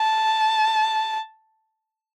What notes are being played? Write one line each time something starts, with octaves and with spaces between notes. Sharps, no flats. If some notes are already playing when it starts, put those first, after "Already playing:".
Already playing: A5